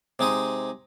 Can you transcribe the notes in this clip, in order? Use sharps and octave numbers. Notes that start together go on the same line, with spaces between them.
C3 G#3 D#4 D#6